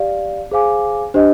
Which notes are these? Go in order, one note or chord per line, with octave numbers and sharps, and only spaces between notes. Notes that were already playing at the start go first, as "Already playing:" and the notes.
Already playing: G4 D5 F5
G#4 C5 F5 G#5 D6
D4 G4 C5 D#5